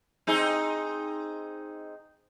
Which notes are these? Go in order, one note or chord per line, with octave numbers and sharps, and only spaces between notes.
C4 D#4 G#4